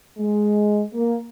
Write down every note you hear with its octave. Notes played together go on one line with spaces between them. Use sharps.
G#3
A#3